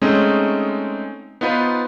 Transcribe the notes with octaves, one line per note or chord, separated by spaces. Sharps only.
G#3 A3 C4 C#4 D#4
B3 D#4 F4 B4 C5